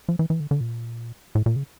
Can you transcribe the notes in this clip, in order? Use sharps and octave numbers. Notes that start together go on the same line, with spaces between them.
F3
E3
E3
D3
D3
A#2
A2
A#2
C#3